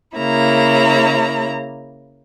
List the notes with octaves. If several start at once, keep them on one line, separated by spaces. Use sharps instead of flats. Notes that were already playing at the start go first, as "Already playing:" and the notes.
C#3 A#3 E4 A#5